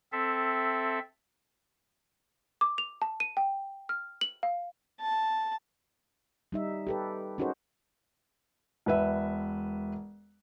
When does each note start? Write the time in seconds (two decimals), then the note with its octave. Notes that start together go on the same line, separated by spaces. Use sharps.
0.12 C4 A4 E5
2.61 D6
2.78 F7
3.02 A5
3.20 D#7
3.37 G5
3.89 F6
4.21 F#7
4.43 F5
5.01 A5
6.52 G3 D#4 E5
6.87 G4 A4 B4
7.38 C#4 D#4 F#4 G#4 A#4 C5
8.86 E1 B4 E5